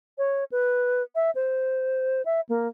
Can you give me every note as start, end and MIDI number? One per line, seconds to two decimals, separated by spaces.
0.18 0.44 73
0.52 1.03 71
1.15 1.31 76
1.35 2.22 72
2.25 2.41 76
2.49 2.68 58